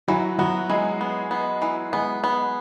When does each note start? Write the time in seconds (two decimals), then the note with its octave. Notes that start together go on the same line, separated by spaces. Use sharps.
0.08 E3 F#3 F#4
0.38 F#3 B3 F#4
0.69 E3 G#3 G#4
1.01 B3
1.31 B3
1.62 E3
1.93 G#3 B3 G#4
2.24 B3